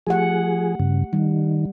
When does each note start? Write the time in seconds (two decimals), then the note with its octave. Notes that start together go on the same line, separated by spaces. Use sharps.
0.07 F3 A3 G4 G#4 F#5
0.80 G2 C#3
1.13 D#3 G3